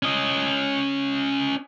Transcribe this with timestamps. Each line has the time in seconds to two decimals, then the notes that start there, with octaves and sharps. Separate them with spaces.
0.03 C#4 D#5